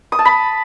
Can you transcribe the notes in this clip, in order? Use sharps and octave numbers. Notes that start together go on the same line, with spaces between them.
D#6
A5
B5